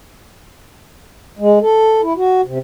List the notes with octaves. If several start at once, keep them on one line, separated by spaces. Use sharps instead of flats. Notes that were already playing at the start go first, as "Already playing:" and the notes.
G#3
A4
E4
F#4
C3